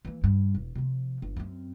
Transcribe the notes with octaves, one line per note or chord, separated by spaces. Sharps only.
E3 A#3
G2
E1
C3 F3
G1
F#2 C4